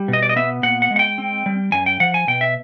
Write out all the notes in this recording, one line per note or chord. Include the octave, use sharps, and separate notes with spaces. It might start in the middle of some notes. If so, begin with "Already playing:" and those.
Already playing: G3
B2
D#5
D5
D#5
B3 E5
A#2 F#5
F#5
G#3
F#5
G5
C4
G3
F#2 G#5
G5
F3 F#5
G#5
B2 G5
E5